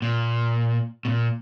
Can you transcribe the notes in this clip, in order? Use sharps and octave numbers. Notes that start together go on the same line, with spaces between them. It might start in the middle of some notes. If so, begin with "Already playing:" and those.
A#2
B2
A#2